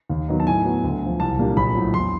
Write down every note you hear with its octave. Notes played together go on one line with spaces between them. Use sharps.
D#2
D#3 F#3 B3 D#4
A5
A2 G#5
F#3 B3
D2
D3 F3
C2 A5
A#2 G3 A#3 D4
A#1 B5
A2 F#3
E2 C6